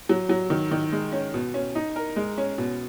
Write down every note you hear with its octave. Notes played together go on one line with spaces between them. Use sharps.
F#3
F#3
D#3
D#3
G#3
C#4
B2
C#4
D#4
A#4
G#3
C#4
B2